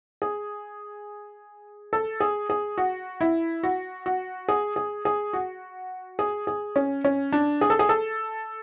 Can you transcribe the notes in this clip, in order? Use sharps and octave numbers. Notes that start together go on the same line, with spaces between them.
G#4
A4
G#4
G#4
F#4
E4
F#4
F#4
G#4
G#4
G#4
F#4
G#4
G#4
C#4
C#4
D4
G#4
A4
G#4
A4